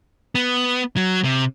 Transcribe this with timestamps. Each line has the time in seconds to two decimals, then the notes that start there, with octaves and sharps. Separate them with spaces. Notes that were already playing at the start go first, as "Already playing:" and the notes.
0.35 B3
0.97 F#3
1.24 C3